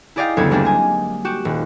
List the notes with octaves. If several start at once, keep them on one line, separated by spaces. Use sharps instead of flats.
E4 G#4 D5 D#5 F5 G5
F#1 D2 B3 G4 A4 G#6
G3 G#3 A#3 C4 D4 E4
D#5 G#5
F#4 G4 E7
D#1